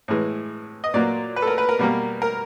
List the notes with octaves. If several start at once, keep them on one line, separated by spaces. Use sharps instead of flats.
A2 E3 G#3
D#5
A#2 F#3 A#3 D5
B4
A4
A#4
B4
A#4
B2 G3 A#3
A#4